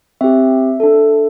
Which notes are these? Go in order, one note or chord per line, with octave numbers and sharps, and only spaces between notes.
C4 G4 E5
D4 A4